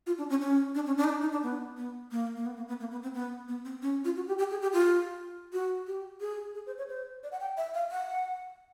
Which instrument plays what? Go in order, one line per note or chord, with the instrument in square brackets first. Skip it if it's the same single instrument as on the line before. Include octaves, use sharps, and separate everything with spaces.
[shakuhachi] F4
D4
C#4
C#4
D4
C#4
D4
D#4
D4
D#4
D4
B3
B3
A#3
A#3
B3
A#3
B3
A#3
B3
C4
B3
B3
C4
C#4
F4
F#4
G4
G4
G#4
G4
F4
F#4
G4
G#4
G#4
C5
C#5
C5
D5
F#5
G5
E5
F5
F#5